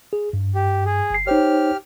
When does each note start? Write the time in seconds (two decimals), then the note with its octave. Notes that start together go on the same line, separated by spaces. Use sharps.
0.13 G#4
0.33 G2
0.55 G4
0.86 G#4
1.10 G1 C7
1.27 D#4 G4 C5 C#5 F6